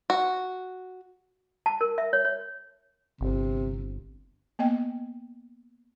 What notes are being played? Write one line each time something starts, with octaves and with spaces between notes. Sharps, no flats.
F#4
A5
A#4
E5
C#5
C#5
G1 C3
A#3 B3 D#5 G5